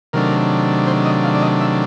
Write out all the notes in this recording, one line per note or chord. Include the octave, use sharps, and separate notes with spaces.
C3 D#3 F#3 A3 D4 A#4
C5
D#5
F5
D5
D#5
E5